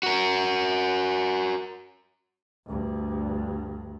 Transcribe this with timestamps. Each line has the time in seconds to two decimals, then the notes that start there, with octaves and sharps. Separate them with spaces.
0.03 F#4 A#4
2.66 D2 G2